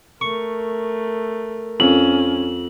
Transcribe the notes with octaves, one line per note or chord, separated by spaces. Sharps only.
A3 A#4 C#6
F2 C#4 F#7